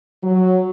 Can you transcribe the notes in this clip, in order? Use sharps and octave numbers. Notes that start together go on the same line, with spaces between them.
F#3